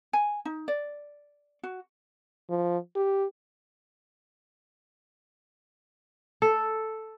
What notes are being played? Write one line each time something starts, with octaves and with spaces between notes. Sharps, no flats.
G#5
D#4
D5
F#4
F3
G4
A4